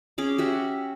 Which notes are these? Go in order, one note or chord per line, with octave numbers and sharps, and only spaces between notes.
C#4 G#4 D6
F#4 G4 E5 F#5